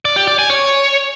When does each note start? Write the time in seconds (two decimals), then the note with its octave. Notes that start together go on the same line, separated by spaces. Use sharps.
0.05 D5
0.16 G4
0.27 D5
0.39 G#5
0.50 C#5